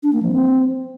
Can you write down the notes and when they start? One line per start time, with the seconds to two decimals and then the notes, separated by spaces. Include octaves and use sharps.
0.03 D4
0.13 A#3
0.23 F3
0.32 C4